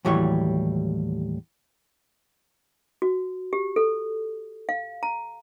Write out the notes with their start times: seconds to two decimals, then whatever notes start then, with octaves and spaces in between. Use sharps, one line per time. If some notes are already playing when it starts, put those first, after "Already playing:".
0.05 D#2 A2 E3 F#3 G3 C#5
3.02 F#4
3.53 G4
3.76 A4
4.69 F5
5.03 A#5